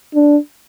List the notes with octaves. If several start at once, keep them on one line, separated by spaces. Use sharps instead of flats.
D4